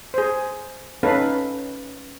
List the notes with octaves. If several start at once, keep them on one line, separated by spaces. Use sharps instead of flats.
G#4 C5
C#4 D#4 A4 B4 F5